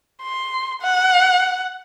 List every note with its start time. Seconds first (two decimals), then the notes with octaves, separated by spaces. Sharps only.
0.23 C6
0.82 F#5